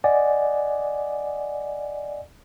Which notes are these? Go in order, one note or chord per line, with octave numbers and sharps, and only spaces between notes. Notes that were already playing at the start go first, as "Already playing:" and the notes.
D5 D#5 F#5 G#5